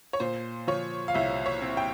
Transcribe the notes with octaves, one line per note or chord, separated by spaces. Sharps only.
C#5
A#2 C5
F3 C#5
F5
C2 E5
C#5
C4
G5